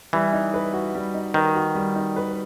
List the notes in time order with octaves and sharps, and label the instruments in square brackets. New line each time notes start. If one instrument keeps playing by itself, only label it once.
[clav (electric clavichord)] E3 [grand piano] G3
[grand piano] D#4
B4
F#4
G3
D#4
[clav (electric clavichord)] D#3 [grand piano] B4
[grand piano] F#4
G3
D#4
B4